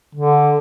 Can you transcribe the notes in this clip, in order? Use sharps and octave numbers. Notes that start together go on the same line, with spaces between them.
D3